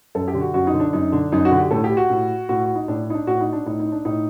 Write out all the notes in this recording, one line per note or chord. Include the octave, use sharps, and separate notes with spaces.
F#2 A4
G4
D3
F#4
F#2 F#4
D#4
D3
D4
F#2 D#4
D3 D4
F#2 D#4
F#4
D3
G4
A2 A4
G4
F#4
A2
A2 F#4
F#4
D#4
A2 D4
D#4
D4
A2 F#4
D#4
D4
A2 D#4
D#4
D4
A2 D#4